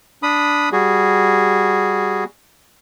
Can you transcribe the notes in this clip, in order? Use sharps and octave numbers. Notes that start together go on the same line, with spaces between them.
D4 B5 D#6
G3 F#4 G#4